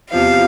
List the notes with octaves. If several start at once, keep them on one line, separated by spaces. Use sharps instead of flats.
E2 C3 F3 F5